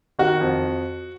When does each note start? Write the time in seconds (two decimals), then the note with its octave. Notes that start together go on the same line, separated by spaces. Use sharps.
0.19 D#3 F#4
0.41 F2